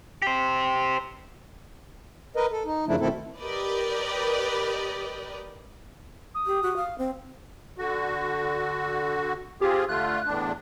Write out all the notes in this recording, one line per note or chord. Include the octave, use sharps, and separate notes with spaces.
G4 C5
A#4 B4 D#5
A4
D#4
F#2 C#3 F3 A3 D4 E4
B2 D#3 A3 C4 E4 A4
G4 A#4 B4 D5 D#5
D#6
G4
F#4
F5
C4
D3 F#4
C4 F4 G4 G#4
D3 A3 F4 F#6
E2 A2 D4